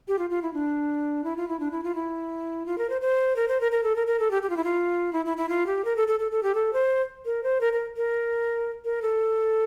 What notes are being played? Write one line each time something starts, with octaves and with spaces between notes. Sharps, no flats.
G4
F4
F4
E4
D4
E4
F4
E4
D4
E4
F4
E4
F4
A#4
C5
C5
A#4
C5
A#4
A#4
A4
A#4
A#4
A4
G4
G4
F4
E4
F4
E4
E4
E4
F4
G4
A#4
A4
A4
A4
A4
G4
A4
C5
A#4
C5
A#4
A#4
A#4
A#4
A4